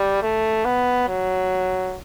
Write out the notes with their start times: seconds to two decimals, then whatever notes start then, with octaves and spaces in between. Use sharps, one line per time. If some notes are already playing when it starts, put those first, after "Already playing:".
Already playing: G3
0.22 A3
0.65 B3
1.08 F#3